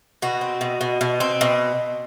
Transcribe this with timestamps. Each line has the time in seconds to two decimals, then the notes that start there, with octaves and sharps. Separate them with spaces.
0.22 B2 F#4
0.41 C4
0.61 B2
0.81 B2
1.01 B2
1.20 C4
1.41 B2